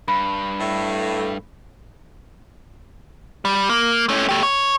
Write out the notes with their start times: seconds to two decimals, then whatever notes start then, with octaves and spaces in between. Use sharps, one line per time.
0.08 G2 B5
0.60 A2 A3
3.45 G3
3.69 A#3
4.09 A3 C#4
4.29 A3 G4
4.43 C#5